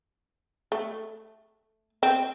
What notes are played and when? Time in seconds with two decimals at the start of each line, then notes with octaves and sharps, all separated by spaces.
0.72 A3
2.03 C4